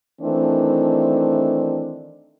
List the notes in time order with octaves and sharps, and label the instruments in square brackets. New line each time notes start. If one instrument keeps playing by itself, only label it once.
[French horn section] D#3 E3 A3 C4 D4